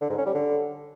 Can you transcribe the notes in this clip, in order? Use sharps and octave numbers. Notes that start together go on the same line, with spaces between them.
D3
G#2
C#4
G3
D3